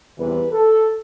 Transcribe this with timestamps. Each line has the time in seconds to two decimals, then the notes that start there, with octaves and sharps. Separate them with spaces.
0.18 E2 C3 E3 G3 B4
0.52 A4